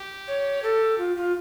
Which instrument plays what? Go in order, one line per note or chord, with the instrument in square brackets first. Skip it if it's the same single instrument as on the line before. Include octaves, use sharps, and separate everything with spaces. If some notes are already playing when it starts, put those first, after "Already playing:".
Already playing: [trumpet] G4
[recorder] C#5
A4
F4
F4